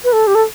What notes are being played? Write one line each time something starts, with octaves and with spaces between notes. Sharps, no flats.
B4
A4
G4
A4